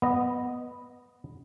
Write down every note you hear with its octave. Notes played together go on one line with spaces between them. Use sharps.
B3 D#5